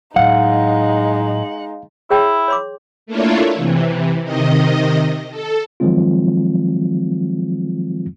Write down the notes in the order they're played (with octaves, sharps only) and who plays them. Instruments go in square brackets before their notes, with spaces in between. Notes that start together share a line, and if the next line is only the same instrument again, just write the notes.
[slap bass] A2 F#3 [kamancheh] G#3 D#4 [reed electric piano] F5 [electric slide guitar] F#5
[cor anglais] E4 [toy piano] G#4 C#5 G5
[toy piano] C#5 C6 D6
[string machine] A3 A#3 D4 E4 F4 C#5
C3 E3
C3 D#3 D#5
A4
[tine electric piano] D#3 F3 F#3 G#3 C4 F4